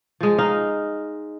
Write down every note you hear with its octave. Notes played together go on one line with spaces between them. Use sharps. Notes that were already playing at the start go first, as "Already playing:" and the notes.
F3 G#3
D#4 F5